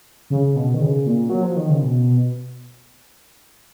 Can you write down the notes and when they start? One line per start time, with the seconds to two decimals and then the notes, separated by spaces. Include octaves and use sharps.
0.30 C#3
0.56 B2
0.74 D#3
0.81 C#3
1.06 A#2
1.30 F#3
1.43 F3
1.56 D#3
1.69 C#3
1.83 B2